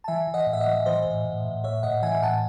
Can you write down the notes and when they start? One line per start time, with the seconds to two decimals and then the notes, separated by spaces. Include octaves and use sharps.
0.04 A5
0.08 E3 E5 G#5
0.27 E3
0.34 D#5 F#5
0.46 A2 D#5
0.53 E5
0.60 D#5 F#5
0.67 E3
0.86 E3 C5 D#5
1.06 A2
1.25 A2
1.45 A2
1.64 A2 C#5 E5
1.83 A2 D#5 F#5
2.02 E3 E5 G#5
2.23 A2 F#5 A5